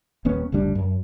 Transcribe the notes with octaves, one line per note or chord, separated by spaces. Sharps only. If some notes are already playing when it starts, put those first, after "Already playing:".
D#1 D#2 B3 C#4
F#1 D2 G3 D4
F#2